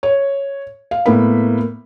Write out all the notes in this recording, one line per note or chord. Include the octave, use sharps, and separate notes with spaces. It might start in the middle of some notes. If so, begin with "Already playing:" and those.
C#5
F5
A2 A#3 B3 B5